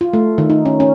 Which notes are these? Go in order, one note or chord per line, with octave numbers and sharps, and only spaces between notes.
F4
A3
D#3
D#4
C#4
C#4